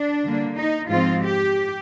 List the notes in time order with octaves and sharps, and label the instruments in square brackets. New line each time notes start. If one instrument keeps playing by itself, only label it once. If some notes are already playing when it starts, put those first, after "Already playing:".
Already playing: [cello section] D4
D3 G3 A#3
D#4
G#2 F3 C4 F4
G4